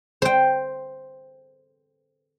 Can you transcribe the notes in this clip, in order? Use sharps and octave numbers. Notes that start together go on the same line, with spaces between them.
C5 G5